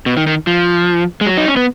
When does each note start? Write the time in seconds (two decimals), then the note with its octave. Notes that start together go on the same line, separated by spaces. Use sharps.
0.06 B2
0.17 D#3
0.27 D#3
0.47 F3
1.21 G#3
1.26 F#3
1.37 D#4
1.48 C#4
1.56 B3